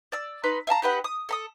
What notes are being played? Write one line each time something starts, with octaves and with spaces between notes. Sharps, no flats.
D5 E6
D#4 B4 C6
E5 F5 A5 A#5
D#4 G4 B4 F#5
D#6
A4 A#5 D#6